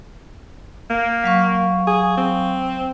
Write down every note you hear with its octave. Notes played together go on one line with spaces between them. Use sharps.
A#3
F#3 F5 C#6
G#4
C4